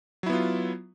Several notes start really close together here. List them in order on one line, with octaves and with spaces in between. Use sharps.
F#3 E4 B3 F4